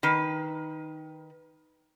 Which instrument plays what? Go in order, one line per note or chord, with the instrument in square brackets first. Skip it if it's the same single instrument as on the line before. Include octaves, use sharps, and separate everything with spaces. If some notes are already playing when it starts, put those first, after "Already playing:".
[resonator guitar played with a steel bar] D#3 B4